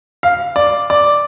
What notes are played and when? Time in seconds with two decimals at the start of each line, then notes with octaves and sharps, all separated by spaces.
0.23 F5
0.56 D5
0.90 D5